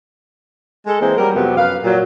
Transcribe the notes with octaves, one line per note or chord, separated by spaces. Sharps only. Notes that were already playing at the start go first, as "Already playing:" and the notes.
G#3 A4
E3 G#3 A#3 C4
F#3 G3 A#4
F2 C3 F#3 B3
F#2 B4 F5
A#2 F#3